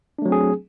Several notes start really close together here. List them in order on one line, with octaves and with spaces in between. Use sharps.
D4 A3 F#3 C4 G#4